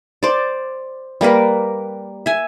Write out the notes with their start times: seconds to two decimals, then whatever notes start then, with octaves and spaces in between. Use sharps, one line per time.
0.23 C5 D5
1.21 G3 A#3 A#4 B4
2.26 E5 G#5